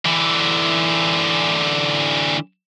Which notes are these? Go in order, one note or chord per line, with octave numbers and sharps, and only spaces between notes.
D3 E3